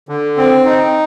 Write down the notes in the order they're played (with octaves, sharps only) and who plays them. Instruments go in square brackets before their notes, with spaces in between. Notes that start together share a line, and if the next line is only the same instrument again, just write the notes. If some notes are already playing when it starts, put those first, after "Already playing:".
[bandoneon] D3
C4
D#4